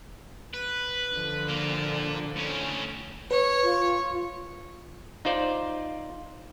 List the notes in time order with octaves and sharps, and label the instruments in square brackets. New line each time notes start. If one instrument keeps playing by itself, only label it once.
[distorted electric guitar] B4
[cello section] D3 F3
[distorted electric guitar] A#2 A#3
A2 C#4
[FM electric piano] B4 [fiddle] C#5
[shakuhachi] F4
[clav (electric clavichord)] D#4 F4 C5 D5